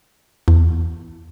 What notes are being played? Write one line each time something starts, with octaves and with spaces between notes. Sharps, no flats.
E2